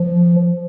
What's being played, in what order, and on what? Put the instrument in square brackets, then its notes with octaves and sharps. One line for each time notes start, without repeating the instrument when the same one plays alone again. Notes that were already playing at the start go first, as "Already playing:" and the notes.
Already playing: [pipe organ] F3